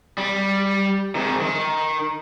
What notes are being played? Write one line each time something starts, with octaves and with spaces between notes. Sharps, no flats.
G3
G#2 D#3
D#3